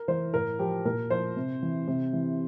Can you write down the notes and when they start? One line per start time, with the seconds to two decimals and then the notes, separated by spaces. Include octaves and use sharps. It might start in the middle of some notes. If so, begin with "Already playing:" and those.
Already playing: A#4
0.08 E3 C5
0.34 A2 A#4
0.59 F3 G4
0.85 A#2 A#4
1.10 F3 C5
1.36 C3
1.63 E3
1.88 C3
2.13 E3